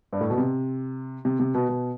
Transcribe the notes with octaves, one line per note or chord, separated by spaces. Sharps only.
G2
A2
B2
C3
C3
C3
B2
B2